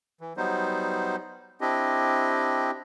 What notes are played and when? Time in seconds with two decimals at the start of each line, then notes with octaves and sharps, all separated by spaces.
0.21 E3
0.37 F#3 G3 B3 D#4 C5
1.61 C4 D4 E4 G4 D#5